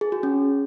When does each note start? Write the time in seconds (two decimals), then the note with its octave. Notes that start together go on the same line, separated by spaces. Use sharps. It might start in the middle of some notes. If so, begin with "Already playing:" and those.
0.01 G#4
0.12 F#4
0.23 C#4